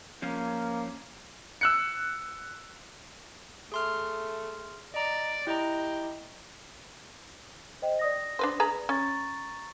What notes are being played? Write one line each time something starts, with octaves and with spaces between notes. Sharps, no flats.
F3 A#3 C#4 F4
E6 F#6 C#7
A3 G#4 C6 F6
D5 D#5 A#5
E4 G4 D#5 A#5
C5 D#5 G5
D5 D#6 A#6
D4 B4 C5
G#4 B4 A#5
C#4 A#5 C#6 A6